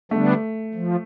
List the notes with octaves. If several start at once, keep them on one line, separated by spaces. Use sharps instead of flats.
D3 G3 A3 B3 D4
F3